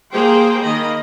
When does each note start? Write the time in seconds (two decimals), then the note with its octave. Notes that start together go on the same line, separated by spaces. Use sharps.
0.13 A#3 G4 G#4 C5 G5 C6
0.61 D#3 A#3 D#5 B5